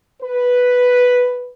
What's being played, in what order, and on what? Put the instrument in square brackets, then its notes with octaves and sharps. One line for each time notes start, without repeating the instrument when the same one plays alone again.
[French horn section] B4